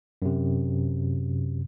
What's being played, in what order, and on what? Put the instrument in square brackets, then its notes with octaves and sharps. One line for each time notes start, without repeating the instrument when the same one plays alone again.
[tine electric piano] F#2 C3